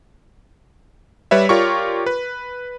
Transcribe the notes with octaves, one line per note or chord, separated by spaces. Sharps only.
G3 B4 C#5 E5
F4 G4 A#4 C#5 D5 C#6
B4